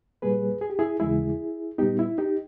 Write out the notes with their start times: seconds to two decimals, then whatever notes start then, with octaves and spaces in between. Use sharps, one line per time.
0.22 A#2 G3 A#3 G#4 B4
0.61 G#4
0.70 G4
0.79 E4 G#4
1.00 D#2 C#3 E3 G#3 E4 G#4
1.78 A#2 G3 B3 D#4 G4
1.99 E4
2.18 D#4 G4